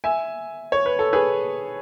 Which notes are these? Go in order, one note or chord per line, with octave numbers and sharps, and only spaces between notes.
E5 G#5
C#5
B4
A4
G#4 B4